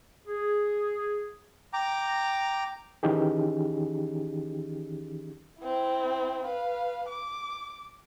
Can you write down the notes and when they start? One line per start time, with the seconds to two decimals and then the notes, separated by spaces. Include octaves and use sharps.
0.27 G#4
1.73 G5 A#5 D6
3.03 D#3 E3 C#4 D#4 G4 G#4
5.59 C4 E4
6.45 B4 F5
7.09 D6